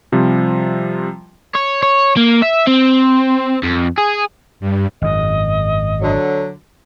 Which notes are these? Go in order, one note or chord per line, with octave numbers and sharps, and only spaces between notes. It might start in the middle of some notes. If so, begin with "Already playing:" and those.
C3 F3 G3
C#5
C#5
A#3
E5
C4
F2
G#4
G2
G#1 F#2 D#5
D3 F#3